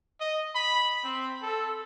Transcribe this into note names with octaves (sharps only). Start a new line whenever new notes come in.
D#5
B5
C4
A4